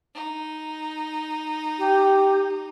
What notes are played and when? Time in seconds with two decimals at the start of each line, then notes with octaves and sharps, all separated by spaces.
0.14 D#4
1.79 G4